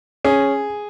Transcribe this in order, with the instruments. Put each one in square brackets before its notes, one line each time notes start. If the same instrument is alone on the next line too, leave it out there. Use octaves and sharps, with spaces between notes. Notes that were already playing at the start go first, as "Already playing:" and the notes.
[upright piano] C#4 [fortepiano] G#4